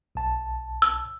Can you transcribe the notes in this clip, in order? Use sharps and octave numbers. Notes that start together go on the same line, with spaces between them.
B1 A5
E6